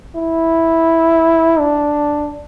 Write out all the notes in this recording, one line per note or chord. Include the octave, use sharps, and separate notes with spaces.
E4
D4